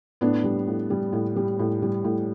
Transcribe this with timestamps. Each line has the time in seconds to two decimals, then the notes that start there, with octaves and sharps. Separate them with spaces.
0.21 A2 B3 D4
0.44 G3
0.68 A2
0.90 G3
1.13 A2
1.36 G3
1.59 A2
1.82 G3
2.04 A2